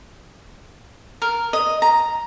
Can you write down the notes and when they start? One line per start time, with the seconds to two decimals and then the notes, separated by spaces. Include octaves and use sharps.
1.22 A#4
1.53 D#5
1.82 A#5